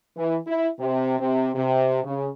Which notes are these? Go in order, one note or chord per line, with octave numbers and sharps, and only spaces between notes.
E3
E4
C3
C3
C3
C#3